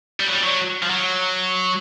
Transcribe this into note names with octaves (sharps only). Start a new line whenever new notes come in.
G3
F#3
G3
F#3
F3
F#3